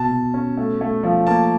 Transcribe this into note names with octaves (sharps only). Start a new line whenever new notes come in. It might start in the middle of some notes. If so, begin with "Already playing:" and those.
Already playing: B2 A5
B2
C#4
A3
A3
F3
A#3 A5